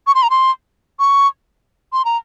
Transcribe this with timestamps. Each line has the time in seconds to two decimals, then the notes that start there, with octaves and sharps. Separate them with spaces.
0.07 C#6
0.15 C6
0.23 A#5
0.30 C6
0.99 C#6
1.93 C6
2.05 A#5